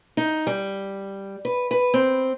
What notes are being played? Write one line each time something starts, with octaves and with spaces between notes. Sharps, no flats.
D#4
G3
B4
B4
C4